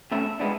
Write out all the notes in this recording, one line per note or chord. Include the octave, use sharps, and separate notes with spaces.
B2 A3 C#4 E5
G#3 B3 D4